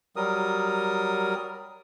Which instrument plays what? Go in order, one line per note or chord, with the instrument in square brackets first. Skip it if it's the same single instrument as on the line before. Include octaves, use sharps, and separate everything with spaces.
[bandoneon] F#3 G3 A#4 D#6